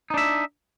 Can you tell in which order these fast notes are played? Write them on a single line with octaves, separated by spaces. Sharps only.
D#4 D4 E5